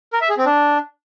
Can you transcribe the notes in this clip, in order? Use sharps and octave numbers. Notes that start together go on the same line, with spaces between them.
A#4
E5
G#4
C4
D4